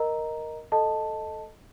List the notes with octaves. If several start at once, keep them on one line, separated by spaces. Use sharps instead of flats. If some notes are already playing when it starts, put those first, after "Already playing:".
Already playing: A#4 D#5 A#5
A4 D#5 A5